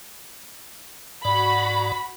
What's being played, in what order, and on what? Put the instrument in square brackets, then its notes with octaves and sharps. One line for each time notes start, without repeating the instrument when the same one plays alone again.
[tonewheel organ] G#2 D5 [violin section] F#4 B5